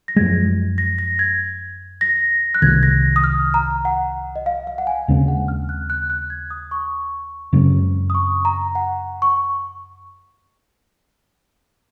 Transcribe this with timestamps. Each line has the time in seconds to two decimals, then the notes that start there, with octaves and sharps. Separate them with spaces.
0.08 A#6
0.16 F#2 F3 G#3 G#6
0.78 A#6
0.99 A#6
1.19 G#6
2.01 A#6
2.54 F#6
2.62 C2 C3 D#3 G#6
2.83 A#6
3.16 D#6
3.24 F6
3.54 A#5
3.85 F#5
4.36 D#5
4.46 F5
4.67 F5
4.78 F#5
4.87 G#5
5.08 D#2 C#3 G#3 C4
5.28 F#5
5.48 F6
5.69 F#6
5.90 F#6
6.10 F#6
6.30 G#6
6.51 D#6
6.71 C#6
7.53 F#2 C#3 G#3 C4
8.10 D#6
8.15 C#6
8.45 A#5
8.75 F#5
9.22 C#6